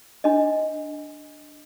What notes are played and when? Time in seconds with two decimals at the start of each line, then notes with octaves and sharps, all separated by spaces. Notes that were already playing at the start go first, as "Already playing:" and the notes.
0.24 D4 D#5